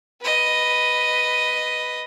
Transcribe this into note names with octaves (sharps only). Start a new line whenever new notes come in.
B4 D#5